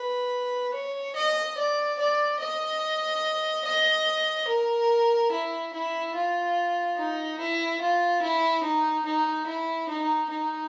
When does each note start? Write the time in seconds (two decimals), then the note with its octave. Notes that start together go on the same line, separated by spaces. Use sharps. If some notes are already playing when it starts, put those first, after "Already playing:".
Already playing: B4
0.74 C#5
1.16 D#5
1.57 D5
1.99 D5
2.40 D#5
3.65 D#5
4.48 A#4
5.32 E4
5.73 E4
6.15 F4
6.97 D#4
7.39 E4
7.81 F4
8.22 E4
8.63 D#4
9.05 D#4
9.47 E4
9.89 D#4
10.30 D#4